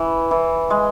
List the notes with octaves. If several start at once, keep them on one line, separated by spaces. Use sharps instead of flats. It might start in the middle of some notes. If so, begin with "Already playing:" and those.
Already playing: E3
E3
G#3